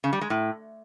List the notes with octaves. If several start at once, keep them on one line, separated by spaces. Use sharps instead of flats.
C#3
G3
G#3
A2